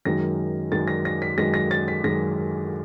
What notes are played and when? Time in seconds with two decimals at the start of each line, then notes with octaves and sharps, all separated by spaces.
0.05 F#2 D#3 G#3 A#6
0.72 F#2 D#3 G#3 A6
0.88 A#6
1.05 A#6
1.22 B6
1.37 F#2 D#3 G#3 A#6
1.54 A#6
1.71 A6
1.88 B6
2.03 F#2 D#3 G#3 A#6